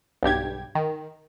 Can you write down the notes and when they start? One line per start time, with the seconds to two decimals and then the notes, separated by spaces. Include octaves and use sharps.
0.23 B1 G2 G4 G#6
0.75 D#3